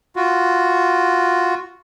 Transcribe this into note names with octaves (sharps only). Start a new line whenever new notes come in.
F4 F#4